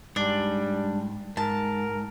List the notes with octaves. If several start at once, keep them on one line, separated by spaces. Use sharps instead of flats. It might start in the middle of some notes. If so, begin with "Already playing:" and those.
G#2 G3 D4
G#2 A#4 A5